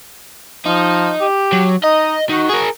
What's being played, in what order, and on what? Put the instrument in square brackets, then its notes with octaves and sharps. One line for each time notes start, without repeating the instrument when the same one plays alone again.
[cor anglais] F3 [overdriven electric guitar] D#4
[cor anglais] G4
[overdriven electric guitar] F#3
[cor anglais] D#4 [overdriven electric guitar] D#5
[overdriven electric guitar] D#3 [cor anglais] F#4
[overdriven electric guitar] G#4 A#4